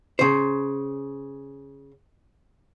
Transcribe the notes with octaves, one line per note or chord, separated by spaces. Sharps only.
C#3 C5